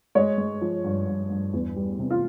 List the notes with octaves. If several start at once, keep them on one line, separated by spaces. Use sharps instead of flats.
G#3 C#5
G#3
F3
G2
G2
G2
E2
G3
C3
F4